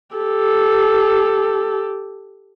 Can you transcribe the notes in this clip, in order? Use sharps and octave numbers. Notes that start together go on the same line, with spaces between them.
G4 A4